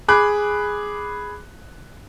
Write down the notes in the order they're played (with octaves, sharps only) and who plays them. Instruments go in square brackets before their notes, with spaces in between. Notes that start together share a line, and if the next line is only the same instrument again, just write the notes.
[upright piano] G#4 B5 D6 F#6